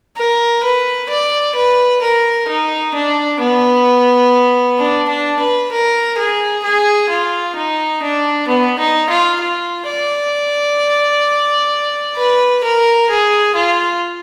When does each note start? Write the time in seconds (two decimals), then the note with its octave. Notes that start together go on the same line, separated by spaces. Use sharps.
0.17 A#4
0.63 B4
1.10 D5
1.56 B4
2.02 A#4
2.48 D#4
2.94 D4
3.40 B3
4.78 D4
5.09 D4
5.40 B4
5.71 A#4
6.18 G#4
6.64 G#4
7.09 F4
7.56 D#4
8.02 D4
8.48 B3
8.79 D#4
9.10 F4
9.41 F4
9.87 D5
12.17 B4
12.64 A#4
13.10 G#4
13.55 F4